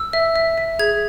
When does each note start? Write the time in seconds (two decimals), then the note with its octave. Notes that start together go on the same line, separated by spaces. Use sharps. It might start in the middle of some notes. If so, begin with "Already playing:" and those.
Already playing: E6
0.13 E5
0.36 E5
0.58 E5
0.79 G#4 G#6